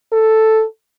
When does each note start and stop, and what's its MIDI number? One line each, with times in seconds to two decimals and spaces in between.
0.13 0.64 69